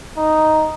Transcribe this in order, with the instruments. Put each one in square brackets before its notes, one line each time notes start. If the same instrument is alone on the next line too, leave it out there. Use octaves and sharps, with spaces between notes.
[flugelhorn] D#4